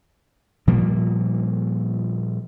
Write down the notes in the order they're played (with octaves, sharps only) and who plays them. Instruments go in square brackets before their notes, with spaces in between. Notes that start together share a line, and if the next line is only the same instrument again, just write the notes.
[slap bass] A#2 F3 G3 A#3